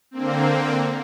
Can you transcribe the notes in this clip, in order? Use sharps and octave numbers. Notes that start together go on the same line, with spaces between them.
D3 A#3 C4